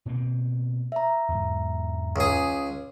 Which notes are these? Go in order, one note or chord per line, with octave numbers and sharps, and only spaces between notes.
B2 A#3 C4
E5 A#5
E2 G#2
C#2 G#4